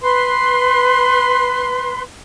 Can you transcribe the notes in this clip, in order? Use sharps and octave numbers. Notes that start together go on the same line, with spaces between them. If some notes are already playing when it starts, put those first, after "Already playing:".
B4 C6